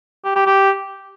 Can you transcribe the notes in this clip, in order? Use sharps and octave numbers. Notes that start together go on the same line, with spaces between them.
G4
G4
G4